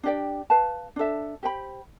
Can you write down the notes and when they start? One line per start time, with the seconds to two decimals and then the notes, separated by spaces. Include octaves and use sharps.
0.03 D4 G4 D5 G5
0.50 B4 F5 A5
0.96 D4 A4 E5
1.43 G4 C5 G5 B5